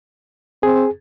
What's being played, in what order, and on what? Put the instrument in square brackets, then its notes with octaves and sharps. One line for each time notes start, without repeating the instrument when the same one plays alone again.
[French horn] C4 [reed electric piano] G#4